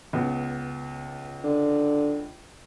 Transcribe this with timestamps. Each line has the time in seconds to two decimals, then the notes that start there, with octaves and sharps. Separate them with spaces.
0.13 C#2 B3
1.44 D3